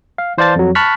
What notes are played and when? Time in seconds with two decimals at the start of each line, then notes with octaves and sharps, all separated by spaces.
0.18 F5
0.38 E3 C5 D5 F5 A5 A6
0.56 F2 F#3
0.75 A5 B5 C#6 F6 F#6 B6